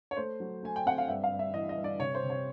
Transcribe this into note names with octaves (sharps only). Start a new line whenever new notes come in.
C#5
A3 C5
F#3
A3 G#5
G5
C4 F#5
F5
G2 E5
F5
G2
E5
E3 D#5
D#5
G2
D5
C3 C#5
C5
C3
C#5